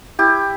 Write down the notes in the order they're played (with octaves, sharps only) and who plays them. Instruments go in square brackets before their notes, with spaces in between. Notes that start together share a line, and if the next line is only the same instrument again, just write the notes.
[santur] E4 G4